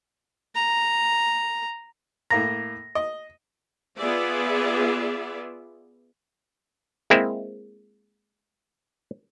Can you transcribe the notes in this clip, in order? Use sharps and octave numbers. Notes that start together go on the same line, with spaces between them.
A#5
A2 A#3 A#5 A#6
D#5
B3 F4 G#4 D5 E5
G#3 A#3 C4 E4